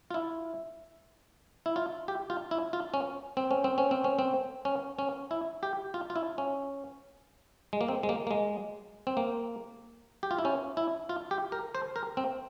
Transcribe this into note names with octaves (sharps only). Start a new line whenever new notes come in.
F4
E4
E4
F4
G4
F4
E4
F4
C#4
C4
C#4
C4
C#4
C4
C#4
C4
C#4
C#4
E4
G4
F4
F4
E4
C#4
G#3
A#3
C4
G#3
A#3
A#3
G#3
C4
A#3
G4
F4
E4
C#4
E4
F4
G4
A#4
C5
A#4
C4